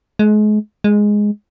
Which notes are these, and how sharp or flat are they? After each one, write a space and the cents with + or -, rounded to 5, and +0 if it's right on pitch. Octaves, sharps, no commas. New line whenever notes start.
G#3 +35
G#3 +0